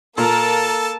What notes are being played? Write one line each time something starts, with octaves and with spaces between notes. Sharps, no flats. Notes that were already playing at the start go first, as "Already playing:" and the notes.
A#2 A#3 A4 A#4 A5